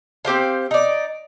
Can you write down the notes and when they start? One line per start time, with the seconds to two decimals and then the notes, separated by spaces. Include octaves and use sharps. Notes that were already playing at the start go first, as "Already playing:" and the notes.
0.25 C4 G4 C5 F5
0.71 D#4 D5